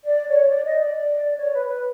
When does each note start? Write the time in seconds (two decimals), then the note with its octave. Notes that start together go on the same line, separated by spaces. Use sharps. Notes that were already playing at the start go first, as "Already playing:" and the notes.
0.04 D5
0.27 C#5
0.49 D5
0.64 D#5
0.79 D5
1.38 C#5
1.53 B4
1.67 B4